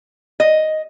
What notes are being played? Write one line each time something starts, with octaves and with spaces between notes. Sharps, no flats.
D#5